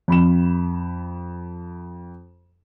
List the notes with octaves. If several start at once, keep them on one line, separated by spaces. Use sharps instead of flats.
F2 B5 E7